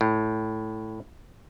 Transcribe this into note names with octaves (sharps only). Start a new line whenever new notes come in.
A2